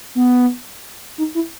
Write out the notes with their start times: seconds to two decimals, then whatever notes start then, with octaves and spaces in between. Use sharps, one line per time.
0.15 B3
1.18 D#4
1.35 E4